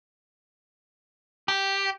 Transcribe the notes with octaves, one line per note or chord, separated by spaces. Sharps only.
G4